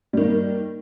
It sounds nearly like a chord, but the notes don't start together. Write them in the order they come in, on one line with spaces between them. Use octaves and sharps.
G3 D#3 A#3